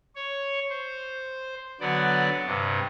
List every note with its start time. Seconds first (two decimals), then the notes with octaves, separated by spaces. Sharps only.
0.15 C#5
0.70 C5
1.81 D3 F#3 B3 D5 F#5
2.46 G2 C3